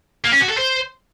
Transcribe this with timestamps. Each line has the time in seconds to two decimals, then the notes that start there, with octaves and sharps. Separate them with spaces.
0.24 A#3
0.32 C#4
0.41 F#4
0.49 A4
0.57 C5